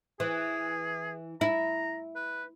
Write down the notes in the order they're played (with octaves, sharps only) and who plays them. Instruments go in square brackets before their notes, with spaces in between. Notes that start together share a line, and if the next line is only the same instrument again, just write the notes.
[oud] E3 [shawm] G#4
[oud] E4 [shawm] A#5
[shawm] B4